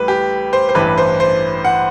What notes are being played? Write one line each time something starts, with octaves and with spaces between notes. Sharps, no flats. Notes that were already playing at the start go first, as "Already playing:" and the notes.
Already playing: A1 A2 G3 B4
G4
C5
C5
A1 G2 E3 B4
C5
C5
F#5